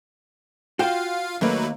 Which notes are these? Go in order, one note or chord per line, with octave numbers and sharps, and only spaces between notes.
F4 F#4 F5 G5
D#2 F#3 A3 A#3 B4